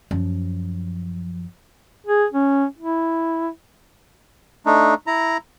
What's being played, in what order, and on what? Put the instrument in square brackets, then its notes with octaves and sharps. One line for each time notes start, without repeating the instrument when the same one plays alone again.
[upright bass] F#2 F3
[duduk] G#4
C#4
E4
[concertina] A3 D4 D#4
E4 A#5